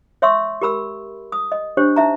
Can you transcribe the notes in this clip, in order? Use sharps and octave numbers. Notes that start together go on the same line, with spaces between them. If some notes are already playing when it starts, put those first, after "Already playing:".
C#5 E5 C6 C#6 E6
G4 A#4 B5 E6
D#6
D#5
D4 G4 C5 C#5
D#4 E5 A#5